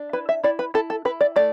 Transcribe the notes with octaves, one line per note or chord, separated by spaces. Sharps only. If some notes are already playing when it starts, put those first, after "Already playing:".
Already playing: D4
E4 B4
E5
E4 D5
B4
E4 A4
A4
E4 B4
D5
A3 D5